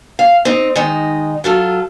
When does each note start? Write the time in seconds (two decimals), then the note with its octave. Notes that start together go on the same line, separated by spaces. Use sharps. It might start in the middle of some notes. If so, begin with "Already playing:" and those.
0.19 F5
0.45 C4 D#4
0.76 D#3 G#3 D#4
1.44 F#3 F4 A4